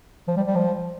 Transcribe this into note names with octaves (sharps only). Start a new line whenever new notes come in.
F3
G3
G3
F3